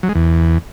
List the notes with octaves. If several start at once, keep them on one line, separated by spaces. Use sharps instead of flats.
F#3
G#3
E2